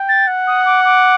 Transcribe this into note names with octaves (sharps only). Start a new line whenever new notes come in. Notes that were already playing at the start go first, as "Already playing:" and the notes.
Already playing: G5
A6
F#5
D#6
D6
D6